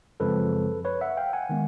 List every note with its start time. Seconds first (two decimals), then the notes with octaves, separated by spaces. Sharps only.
0.20 F#2 C#3 F3 G#3 C4 A4 B4
0.85 B4 C#5
1.01 E5 F#5
1.17 F5 G5
1.33 F#5 G#5
1.49 D#3 G#3 B3